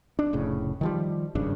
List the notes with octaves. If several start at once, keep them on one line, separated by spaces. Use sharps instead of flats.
D4
F1 A2 C#3
D#3 F3 G3
G#1 G2 C#3 D4